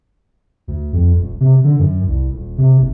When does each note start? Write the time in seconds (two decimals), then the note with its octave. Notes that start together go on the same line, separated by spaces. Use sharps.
0.68 D2
0.93 F2
1.16 D#1
1.40 C3
1.64 D3
1.79 F#2
2.07 C2
2.32 D#1
2.58 C3
2.79 F#1